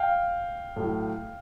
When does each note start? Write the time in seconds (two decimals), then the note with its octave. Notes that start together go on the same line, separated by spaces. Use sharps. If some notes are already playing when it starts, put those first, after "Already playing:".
Already playing: F5 G5
0.76 A2 F#3